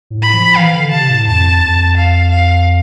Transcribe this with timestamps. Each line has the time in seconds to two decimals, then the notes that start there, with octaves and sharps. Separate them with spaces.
0.10 A2
0.23 B5
0.34 F3
0.57 E3 F5
0.75 D3
0.92 C3 A5
1.10 A2
1.27 F2 A5
1.62 F2
1.97 F5
2.31 F5